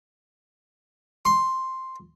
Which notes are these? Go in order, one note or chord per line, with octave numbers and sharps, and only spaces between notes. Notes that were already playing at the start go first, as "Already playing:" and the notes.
C6